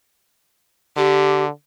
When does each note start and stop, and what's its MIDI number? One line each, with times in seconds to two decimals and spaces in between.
0.97 1.49 50
0.97 1.44 67